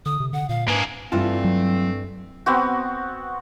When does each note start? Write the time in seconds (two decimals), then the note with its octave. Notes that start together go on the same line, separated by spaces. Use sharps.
0.06 D3 D#6
0.20 C3
0.33 D3 F#5
0.49 A#2 F5
0.68 G#2 A#3 G#4 B4
1.12 G2 E3 A3 C4 D4 F4 A5
1.44 F#3
2.46 B3 C4 F#4